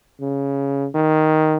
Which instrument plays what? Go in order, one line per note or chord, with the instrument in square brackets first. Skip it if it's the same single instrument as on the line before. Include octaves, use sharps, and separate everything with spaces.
[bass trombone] C#3
D#3